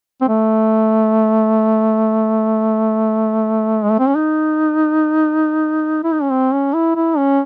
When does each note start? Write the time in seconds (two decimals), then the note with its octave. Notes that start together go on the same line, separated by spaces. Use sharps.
0.21 C4
0.28 A3
3.83 G#3
3.91 A3
3.99 C4
4.08 C#4
4.15 D#4
6.03 E4
6.12 D#4
6.22 C#4
6.31 C4
6.53 C#4
6.74 E4
6.96 E4
7.17 C#4